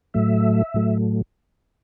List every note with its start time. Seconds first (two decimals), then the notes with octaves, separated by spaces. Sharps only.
0.14 A2 F#3 A3 E5
0.74 A2 F#3 A3